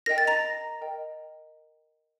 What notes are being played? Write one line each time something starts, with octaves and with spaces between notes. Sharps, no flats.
A#4 D#5 G5 A#6
A6
A#5 A#6
A#4 D#5 G5